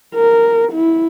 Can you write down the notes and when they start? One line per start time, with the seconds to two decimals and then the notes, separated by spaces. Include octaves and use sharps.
0.15 A#4
0.72 E4